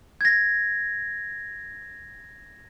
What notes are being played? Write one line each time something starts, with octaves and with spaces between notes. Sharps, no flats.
G#6 A#6